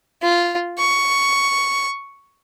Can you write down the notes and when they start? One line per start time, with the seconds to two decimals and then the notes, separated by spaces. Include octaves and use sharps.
0.23 F4
0.79 C#6